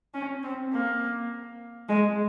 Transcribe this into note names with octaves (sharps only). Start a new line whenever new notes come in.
C#4
C4
A#3
G#3